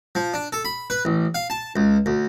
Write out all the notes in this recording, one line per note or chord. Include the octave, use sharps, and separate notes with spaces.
F3
D4
A4
B5
B4
A1
F5
A5
C#2
D2